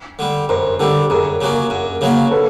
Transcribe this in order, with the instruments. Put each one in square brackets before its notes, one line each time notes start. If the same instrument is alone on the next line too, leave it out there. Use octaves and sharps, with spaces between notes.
[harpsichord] D3 G3
[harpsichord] F#2 [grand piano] A#4 C5
[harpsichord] D3 G3 [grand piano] G4 A4
[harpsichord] F#2 [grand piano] G#4 A#4
[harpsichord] C#3 F#3 A#3
F#2
C#3 F#3 A#3
[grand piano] A4 B4